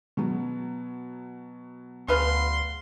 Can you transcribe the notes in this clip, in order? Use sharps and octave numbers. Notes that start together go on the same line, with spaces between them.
B2 F#3
D2 G#4 B4 F5 C6